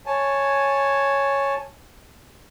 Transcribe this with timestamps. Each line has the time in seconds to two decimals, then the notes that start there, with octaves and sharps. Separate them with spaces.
0.06 C#5 G#5 A5